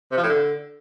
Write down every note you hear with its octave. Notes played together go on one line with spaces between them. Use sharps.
C3
F3
A2
D3